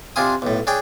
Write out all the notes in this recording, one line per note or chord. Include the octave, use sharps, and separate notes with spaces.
C3 D4 F4 G#5 C6 D#6
B1 A2
D4 G#4 C#5 G5